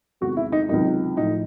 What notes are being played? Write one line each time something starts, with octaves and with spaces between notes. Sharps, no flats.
E2 C3 D#3 G#3 F#4
E4
D#4
C#2 C3 D#3 F#3 D#4
A2 F3 A3 D#4